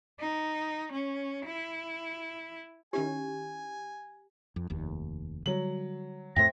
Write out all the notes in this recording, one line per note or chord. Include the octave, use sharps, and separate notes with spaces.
D#4
C#4
E4
D#3 C#4 E4 G4 G#5
F2
F1 D#2
D3 F#3 G3 F#7
F2 A2 A3 C5 E5 G5 A#6